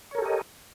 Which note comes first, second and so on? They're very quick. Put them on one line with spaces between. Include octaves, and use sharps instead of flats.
C#5 A#4 A4 G4 D#5